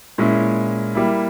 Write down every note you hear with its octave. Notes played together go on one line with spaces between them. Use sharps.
A#2 G#3 C#4 E4
G3 A#3 E4